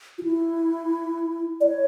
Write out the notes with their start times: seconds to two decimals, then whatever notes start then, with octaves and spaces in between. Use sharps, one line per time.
0.18 F4
0.23 E4
1.61 D5
1.67 C#5